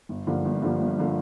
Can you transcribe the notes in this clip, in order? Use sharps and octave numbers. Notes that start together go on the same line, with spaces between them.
G1
G2 D3 F3 A#3
G1
G2 D3 F3 A#3
G1
D3 F3 A#3